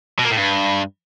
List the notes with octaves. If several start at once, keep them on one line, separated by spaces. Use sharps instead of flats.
B2
A#3
A2
G2